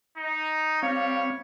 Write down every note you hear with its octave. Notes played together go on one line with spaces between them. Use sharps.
D#4
G3 C4 C#5 F5